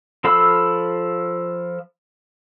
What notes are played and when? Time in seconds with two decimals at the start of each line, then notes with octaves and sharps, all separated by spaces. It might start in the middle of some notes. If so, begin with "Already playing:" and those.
0.24 F3 A4 F5 B5 E6